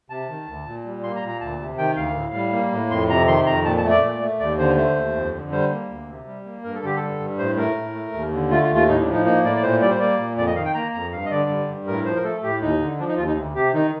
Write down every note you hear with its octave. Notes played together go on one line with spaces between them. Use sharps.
C3 A5
D#3
D2
A#2
G3
A#3 C6
A#5
A#2
A#5
D2 A5
C3
D#3 G5
D2 F5
A2
G3
A#3
A2
F2 C6
C3 A#5
D#3 C6
F2 A#5
A#2 A5
A5
A3
D5
A#2
A3
D#2 D5
D3 C5
A3 C5
D#2
F2
D3
G3 C5
A#3
D2
C3
G3
A#3
G2 A#4
A4
D3 G4
G3 A4
G2
A2 C5
A3 A#4
A2
A3
D#2
D3
A3 F4
F4
D#2
F4
A2 D#4
D4
F3
D#4
A#3 D#4
A2 D5
D5
A#2 C5
G3 D5
C5
A#3 D5
A#2
F2 D5
D#5
D#3 F5
G5
A#3 A#5
F2 A#5
G2 F5
D#5
D3 D5
G3
G2
A2 A#4
F3 C5
A#4
A3 A4
A2 G4
D#2 D#4
D3
F3 D4
D#4
D#2 F4
D#4
D2
C3 G4
D#3 D#4